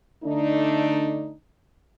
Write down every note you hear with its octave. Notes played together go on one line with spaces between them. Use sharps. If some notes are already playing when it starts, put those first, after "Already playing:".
D3 A3 D4 D#4